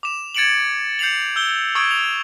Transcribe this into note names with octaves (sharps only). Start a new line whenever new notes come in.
D6 E7
G#6 A6 C#7 D7 E7 F#7
G6 C7 C#7 F7 F#7
E6 G6 G7
C#6 D#6 E6 G#6 D7
F7